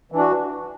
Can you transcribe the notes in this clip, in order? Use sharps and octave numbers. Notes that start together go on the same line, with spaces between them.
E3 D4 F#4